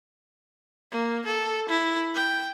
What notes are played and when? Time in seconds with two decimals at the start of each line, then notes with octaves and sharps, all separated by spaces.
0.91 A#3
1.26 A4
1.68 E4
2.15 G5